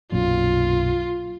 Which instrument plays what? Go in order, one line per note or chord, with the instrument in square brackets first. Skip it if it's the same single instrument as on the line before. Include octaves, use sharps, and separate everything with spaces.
[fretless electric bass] B1 F#2 A#2 [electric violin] F4